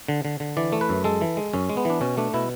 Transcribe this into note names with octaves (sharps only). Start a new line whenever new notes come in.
D3
D3
D3
E3 D5
A3
B4
F#2
G#3 A4
E3
G#3
F#2 C#4
G#3
B3
E3 D4
B2 C#4
A3 D4
B2 E4